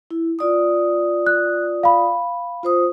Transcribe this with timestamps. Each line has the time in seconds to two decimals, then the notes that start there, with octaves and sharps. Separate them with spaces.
0.11 E4
0.39 F4 D5 D#6
1.27 F#6
1.83 F5 B5
2.63 F4 C5 D#6